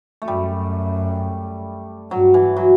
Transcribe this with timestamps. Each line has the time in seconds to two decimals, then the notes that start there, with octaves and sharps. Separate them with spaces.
0.22 A3
0.27 F#2 G3
2.11 G2 F#3
2.34 E3
2.57 F#3